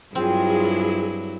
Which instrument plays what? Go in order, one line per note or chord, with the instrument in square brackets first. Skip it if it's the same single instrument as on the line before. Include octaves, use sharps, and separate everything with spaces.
[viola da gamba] G2 F#3 E4 [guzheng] C4 [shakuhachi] F4 [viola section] G#4